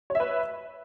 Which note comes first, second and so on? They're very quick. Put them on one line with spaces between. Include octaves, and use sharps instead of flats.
C#5 E5 B4